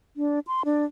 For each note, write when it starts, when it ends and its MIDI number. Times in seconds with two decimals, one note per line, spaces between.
0.17 0.39 62
0.47 0.62 84
0.65 0.85 62